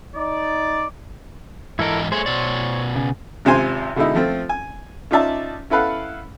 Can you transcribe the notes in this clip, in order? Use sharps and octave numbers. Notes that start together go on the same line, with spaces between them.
D#4 D5
G#2 E3 E4 A4 A#4 D#5
A3 G#4 C5 C#5
B2 D5
C#3
G#1 C3 F4 C5 G#5 C6
B2 D3 G#3 D#4 E4
F3 A3 C4 F4
G#5
C#4 D#4 F4 D5 E5 A5
C#4 E4 A4 B4 F5 F#5